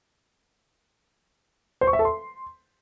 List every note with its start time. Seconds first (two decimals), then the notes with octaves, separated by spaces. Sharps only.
1.81 C5
1.87 C#6
1.93 E5
1.99 A4
2.05 C6